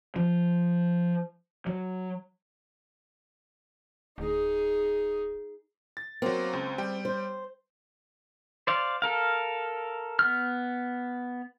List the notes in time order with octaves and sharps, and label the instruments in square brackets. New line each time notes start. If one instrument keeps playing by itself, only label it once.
[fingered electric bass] F3
F#3
[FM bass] D1 [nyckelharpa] D#4 G#4
[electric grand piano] A6
[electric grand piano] F#3 A#3 [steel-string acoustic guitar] C4
[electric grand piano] C#2
G3 G5
[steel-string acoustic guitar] C5
[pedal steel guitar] C5 D5 F5
A4 A#4 F5
B3 F6